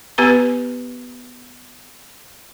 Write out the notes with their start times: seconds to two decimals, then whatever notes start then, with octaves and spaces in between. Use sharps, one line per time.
0.18 B3 G4 B4 A#5